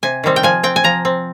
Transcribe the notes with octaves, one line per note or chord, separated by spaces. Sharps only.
C3 G#5
D#3 G3 C4
G5
F3 G#5
C4 G5
G#5
F3 A#5
C4